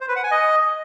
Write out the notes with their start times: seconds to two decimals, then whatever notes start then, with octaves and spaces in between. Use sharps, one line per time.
0.01 C5
0.08 B4
0.16 F#5
0.23 G#5
0.31 D#5